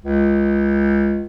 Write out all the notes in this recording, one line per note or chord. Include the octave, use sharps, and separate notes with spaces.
C#2